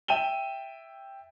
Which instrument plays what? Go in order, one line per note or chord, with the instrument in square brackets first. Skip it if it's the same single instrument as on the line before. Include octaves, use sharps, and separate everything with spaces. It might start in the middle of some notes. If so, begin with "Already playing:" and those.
[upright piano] E5 G5 D#7 E7 G7